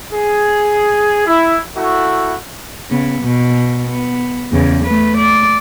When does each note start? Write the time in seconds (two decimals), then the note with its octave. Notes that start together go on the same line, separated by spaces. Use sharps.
0.13 G#4
1.27 E4
1.77 A3 E4 F#4
2.90 C#3 B3
3.22 B2
3.85 B3
4.52 E2 C#3
4.84 A3 B4
5.17 D5